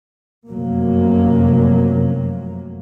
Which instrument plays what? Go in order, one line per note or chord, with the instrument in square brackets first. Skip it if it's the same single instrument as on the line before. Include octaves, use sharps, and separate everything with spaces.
[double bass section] F1 F#2 C3 F#3 A#3